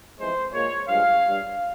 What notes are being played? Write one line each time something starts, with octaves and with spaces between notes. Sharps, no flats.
F2 E3 G#3 C5
A#2 G#3 C#5
G2 F3 G#3 F5
G2 G3